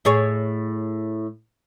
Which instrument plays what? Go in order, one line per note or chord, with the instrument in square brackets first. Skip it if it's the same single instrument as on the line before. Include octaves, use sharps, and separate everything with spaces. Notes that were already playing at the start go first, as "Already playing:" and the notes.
[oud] A2 G#4 C#5